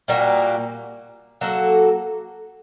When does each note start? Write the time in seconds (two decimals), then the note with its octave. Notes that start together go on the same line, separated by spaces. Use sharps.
0.08 A#2 G3 A#3 F#4
1.41 F#3 A#3 F#4 A4